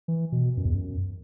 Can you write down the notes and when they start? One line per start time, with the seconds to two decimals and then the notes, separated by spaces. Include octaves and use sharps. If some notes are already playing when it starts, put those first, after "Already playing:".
0.08 E3
0.32 B2
0.57 F#2
0.65 E2
0.75 F#2